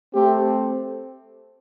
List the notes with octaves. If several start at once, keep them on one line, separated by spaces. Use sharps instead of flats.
A3 C4 G4